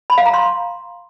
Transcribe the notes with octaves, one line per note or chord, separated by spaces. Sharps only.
B5
F5
A#5
C6